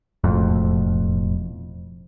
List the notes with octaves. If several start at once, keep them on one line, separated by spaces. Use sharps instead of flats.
E1 F2 A2